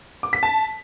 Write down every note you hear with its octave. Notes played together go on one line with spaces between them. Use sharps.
D6
B6
A5